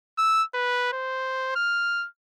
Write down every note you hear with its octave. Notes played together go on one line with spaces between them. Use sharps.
E6
B4
C5
F6